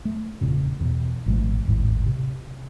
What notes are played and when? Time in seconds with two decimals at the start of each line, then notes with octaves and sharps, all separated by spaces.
0.05 A3
0.41 E1 A#2 C#3
0.80 E2 B2
1.26 G#1 A#2 F3 A3
1.65 D#1 G#1 A2
2.06 C3